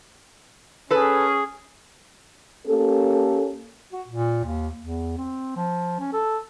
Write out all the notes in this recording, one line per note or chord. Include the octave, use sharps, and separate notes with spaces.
C#4 G#4 A4 B4
A#3 C#4 G4 A4
F#4
A#2
D#2
E2
C4
F3
C#4
A4